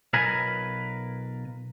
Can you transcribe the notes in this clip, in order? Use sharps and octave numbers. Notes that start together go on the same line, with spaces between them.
B1 B2 F4 A#4 B4 G#5